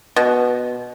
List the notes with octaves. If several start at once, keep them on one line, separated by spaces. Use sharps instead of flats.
B2